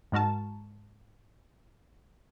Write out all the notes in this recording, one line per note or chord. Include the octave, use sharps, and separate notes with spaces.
G#2 G#3 F#4 A#4 A5